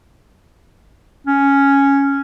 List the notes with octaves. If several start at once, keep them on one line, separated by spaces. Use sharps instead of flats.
C#4